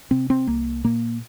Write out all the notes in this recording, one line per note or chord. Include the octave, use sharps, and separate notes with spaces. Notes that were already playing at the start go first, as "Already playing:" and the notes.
C3 C4
C4
C2 A#3
A#2 A#3